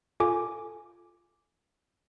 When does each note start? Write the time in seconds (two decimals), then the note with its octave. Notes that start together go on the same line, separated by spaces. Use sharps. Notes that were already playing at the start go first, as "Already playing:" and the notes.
0.20 F4 A4 G#5 D6